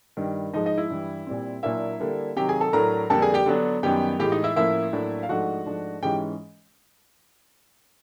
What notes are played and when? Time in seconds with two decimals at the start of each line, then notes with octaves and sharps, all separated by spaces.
0.17 G2 D#3 G3
0.54 G#2 F3 G#3 D#4 D#5
0.66 D#4 D#5
0.78 E4 E5
0.90 G2 E3 G3
1.27 A#2 G3 C4
1.63 A#2 F#3 A#3 D4 E4 E5
2.00 D3 G3 A#3 D4
2.36 C3 D#3 F#3 G4 G5
2.49 G#4 G#5
2.61 A4 A5
2.73 A2 F#3 A3 D4 A#4 A#5
3.10 F2 D3 G3 A#3 D4 A4 A5
3.22 G#4 G#5
3.34 G4 G5
3.46 D3 F#3 B3 D4
3.83 F#2 D#3 G3 B3 G4 G5
4.19 A2 E3 G#3 G4 G5
4.32 D#4 D#5
4.44 E4 E5
4.56 A2 F3 A#3 C#4 E4 E5
4.93 A2 F#3 A#3 D4
5.23 F5
5.29 G#2 F3 A3 D4 F#4 F#5
5.66 G#2 F3 A3 D4
6.03 G#2 E3 G#3 C#4 G4 G5